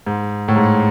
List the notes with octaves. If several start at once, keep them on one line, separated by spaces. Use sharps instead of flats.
G#2
A2
G#2